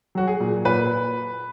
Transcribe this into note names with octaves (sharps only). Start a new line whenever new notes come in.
F#3 F#4
G#4
A#2
A#2 B4